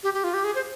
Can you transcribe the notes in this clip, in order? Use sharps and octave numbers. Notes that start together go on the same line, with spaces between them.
G4
G4
F4
G4
G#4
C5